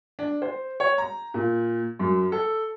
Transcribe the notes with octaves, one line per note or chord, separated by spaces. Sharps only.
D4
C5
C#5
A#5
A#2
F#2
A4